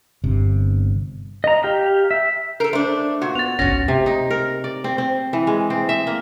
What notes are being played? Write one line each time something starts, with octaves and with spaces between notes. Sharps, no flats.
G1 C3
D#5 A#5
G4 F5 A#5
E5
A4 A#4 G6 C7 D7
A3 D4 A#4 C5
A#2 F#4 F#5
B3 A6 F7
G#1 C#2 F#2 C#4 F#4 A#6
C3
D#4
A#4
D5
C4
C4
E3
G#3
C4
E5
A#3